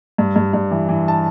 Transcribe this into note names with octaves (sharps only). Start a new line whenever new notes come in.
G2
G2
G2
E3
E3
A5